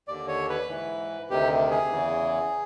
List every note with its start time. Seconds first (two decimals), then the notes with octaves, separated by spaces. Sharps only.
0.08 D#2 D3 D5
0.28 C#5
0.49 B4
0.69 G#2 E3
1.30 D2 C3 D#3 G4
1.71 G#4
1.91 E2 C#3 E3